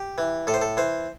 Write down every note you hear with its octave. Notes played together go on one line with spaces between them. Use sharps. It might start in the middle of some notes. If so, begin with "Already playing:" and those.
Already playing: G4
E3
A2 A4
C5
A4
E3 C5